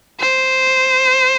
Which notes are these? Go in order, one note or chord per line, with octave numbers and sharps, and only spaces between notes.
C5